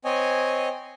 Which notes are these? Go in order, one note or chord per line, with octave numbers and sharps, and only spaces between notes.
C4 C#5 D#5 G#5